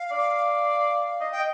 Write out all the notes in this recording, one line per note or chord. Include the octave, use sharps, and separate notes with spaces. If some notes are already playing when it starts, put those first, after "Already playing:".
Already playing: F5
D5
D#5
G5
D#5